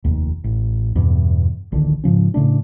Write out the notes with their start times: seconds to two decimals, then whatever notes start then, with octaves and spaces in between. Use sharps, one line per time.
0.05 F1 D#2
0.44 A1
0.96 E2 G2 B2
1.72 D1 A#1 D3 D#3
2.04 G#2 C#3 F3 C#4
2.34 A2 C#3 A3 D4